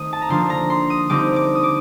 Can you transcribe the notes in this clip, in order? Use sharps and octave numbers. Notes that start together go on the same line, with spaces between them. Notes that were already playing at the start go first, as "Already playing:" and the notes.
Already playing: D#3 A3 C4 D#6
A5
A#5
D3 F3 A#3 D4 C6
A#5
C6
D#6
D3 G3 C4 D#4 D6
D6
D#6
D6